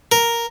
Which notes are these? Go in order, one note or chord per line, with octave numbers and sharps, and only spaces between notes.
A#4